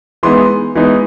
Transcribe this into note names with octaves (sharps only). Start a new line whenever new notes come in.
E3 G#3 B3 D#4 C6
E3 G#3 B3 D#4